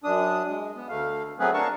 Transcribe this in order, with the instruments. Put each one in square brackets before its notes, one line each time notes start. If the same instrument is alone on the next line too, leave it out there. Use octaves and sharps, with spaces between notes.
[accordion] F#2 D4 D#6
G#3
B3
D2 A3 F5
F#3 A3 B3 C4 G#4 B4
D4 A#4 F5 A5 C#6